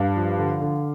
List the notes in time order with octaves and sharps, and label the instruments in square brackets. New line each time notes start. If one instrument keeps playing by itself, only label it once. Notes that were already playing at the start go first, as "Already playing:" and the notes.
Already playing: [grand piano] G2 [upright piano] D5 F5
[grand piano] F3
D3
D3